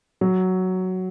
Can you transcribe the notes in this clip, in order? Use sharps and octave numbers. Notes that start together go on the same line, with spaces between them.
F#3